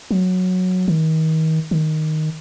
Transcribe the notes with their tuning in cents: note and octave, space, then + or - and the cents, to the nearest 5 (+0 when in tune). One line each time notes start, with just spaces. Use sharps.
F#3 -10
D#3 +35
D#3 +0